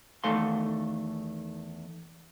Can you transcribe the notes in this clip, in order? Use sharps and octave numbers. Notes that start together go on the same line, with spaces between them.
E2 D#3 A3 A4 F5 C6